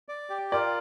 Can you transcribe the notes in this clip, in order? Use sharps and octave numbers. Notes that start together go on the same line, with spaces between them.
D5
G4
F4 A#4 D5